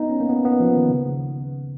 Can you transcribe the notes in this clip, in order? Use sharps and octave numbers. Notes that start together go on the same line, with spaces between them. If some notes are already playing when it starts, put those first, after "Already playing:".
Already playing: B3 D#4
C#4
A#3
B3
B3
F3
D#3
C#3